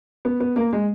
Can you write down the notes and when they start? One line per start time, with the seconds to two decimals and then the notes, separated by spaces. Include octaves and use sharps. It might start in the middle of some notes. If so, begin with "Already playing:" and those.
0.25 B3
0.40 B3
0.56 A#3
0.73 G#3